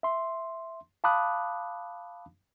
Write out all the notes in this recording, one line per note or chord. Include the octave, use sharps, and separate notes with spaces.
E5 C6
F5 A5 B5 D6 D#6 F#6